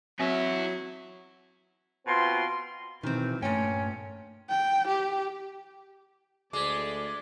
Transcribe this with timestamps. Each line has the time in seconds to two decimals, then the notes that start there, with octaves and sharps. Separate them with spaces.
0.19 F#3 B3 C4 E4 E5
2.07 B2 C4 F4 C6
3.03 B2 D#3 E3 C4
3.42 G2 A#2 A3 C#4 G5
4.49 G5
4.88 G4
6.53 D2 G#3 D5 D6 B6